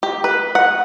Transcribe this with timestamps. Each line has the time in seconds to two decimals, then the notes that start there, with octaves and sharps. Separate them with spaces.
0.03 G4
0.24 B4
0.55 F#5